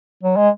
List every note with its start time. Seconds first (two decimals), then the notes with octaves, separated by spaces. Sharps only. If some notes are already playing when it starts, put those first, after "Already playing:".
0.23 F#3
0.36 G#3